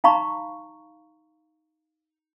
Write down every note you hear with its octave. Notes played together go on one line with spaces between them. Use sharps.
D#4 F5 A#5 B5 C#6